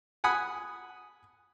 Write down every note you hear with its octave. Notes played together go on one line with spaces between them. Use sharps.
F#5 G#5 B5 D#6